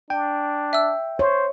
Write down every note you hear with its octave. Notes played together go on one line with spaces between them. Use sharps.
D4 G5
E5 E6
C5 C#5